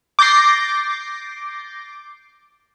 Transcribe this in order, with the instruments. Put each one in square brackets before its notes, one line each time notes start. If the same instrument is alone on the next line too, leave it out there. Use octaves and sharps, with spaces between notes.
[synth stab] D6 G6 A6 A#6 C7